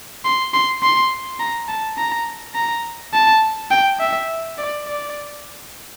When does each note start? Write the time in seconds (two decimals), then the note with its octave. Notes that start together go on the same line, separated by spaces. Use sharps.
0.25 C6
0.54 C6
0.83 C6
1.40 A#5
1.68 A5
1.98 A#5
2.55 A#5
3.14 A5
3.71 G5
4.00 E5
4.58 D5
4.87 D5